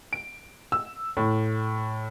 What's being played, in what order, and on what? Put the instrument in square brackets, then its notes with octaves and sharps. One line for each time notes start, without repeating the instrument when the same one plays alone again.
[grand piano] D7
E6
A2